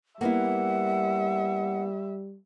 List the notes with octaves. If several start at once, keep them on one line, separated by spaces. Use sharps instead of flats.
G3 A#3 B3 E4 E5 F#5